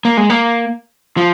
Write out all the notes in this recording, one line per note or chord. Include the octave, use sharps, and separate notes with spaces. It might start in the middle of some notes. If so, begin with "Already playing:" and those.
A#3
G#3
A#3
F3